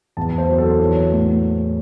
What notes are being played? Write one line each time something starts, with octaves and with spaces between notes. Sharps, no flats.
E2 A5
C5
F#3
A4
E3 C#5
A2